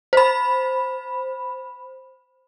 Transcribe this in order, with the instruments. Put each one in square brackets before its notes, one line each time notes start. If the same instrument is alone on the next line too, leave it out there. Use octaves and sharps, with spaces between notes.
[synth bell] C5 B5